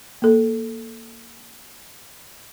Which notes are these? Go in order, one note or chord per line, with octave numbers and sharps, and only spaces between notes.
A#3 A4